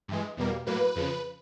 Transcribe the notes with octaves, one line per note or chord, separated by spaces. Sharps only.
G2 E3 G#3
E2 B2 G3 A#3
A2 F#3 A#3 B4
F2 C#3 F3